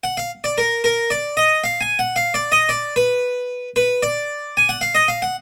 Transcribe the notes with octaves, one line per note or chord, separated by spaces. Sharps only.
F#5
F5
D5
A#4
A#4
D5
D#5
F5
G#5
F#5
F5
D5
D#5
D5
B4
B4
D5
G#5
F#5
F5
D#5
F5
F#5